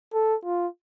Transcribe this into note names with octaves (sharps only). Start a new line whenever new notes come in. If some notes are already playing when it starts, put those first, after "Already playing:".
A4
F4